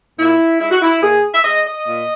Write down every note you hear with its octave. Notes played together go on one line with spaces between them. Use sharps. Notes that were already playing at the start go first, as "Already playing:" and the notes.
A#2 E4
G#3 E4
F#4
E4
A#2 G#4
E5
G#3 D#5
D#5
A#2